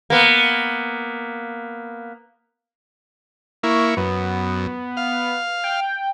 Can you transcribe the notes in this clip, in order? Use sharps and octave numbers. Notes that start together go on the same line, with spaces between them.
A#3 B3
A#3 E4 C#6
F#2 B3
F5
G5